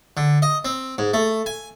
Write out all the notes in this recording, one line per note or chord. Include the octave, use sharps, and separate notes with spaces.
D3
D#5
C4
G#2
A3
G#5